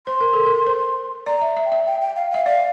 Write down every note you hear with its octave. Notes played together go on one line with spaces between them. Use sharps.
C5 C6
A#4
A4
A#4
C5
D5 A#5
E5
E5
G5
E5
G5
G5
F5
E5 F5
D5 F5